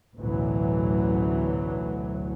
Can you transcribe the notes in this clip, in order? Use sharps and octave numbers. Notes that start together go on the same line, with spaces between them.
A1 D2 B2 E3 F#3